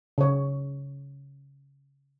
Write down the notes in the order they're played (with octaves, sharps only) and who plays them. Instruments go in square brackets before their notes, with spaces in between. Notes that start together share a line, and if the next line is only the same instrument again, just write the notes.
[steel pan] C#3 C#5